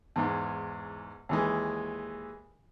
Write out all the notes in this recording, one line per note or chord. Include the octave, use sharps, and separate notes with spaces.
E2 G#2
D#2 E3 G#3